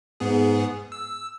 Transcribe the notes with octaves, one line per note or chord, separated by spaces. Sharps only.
G#2 B3 G#4
E6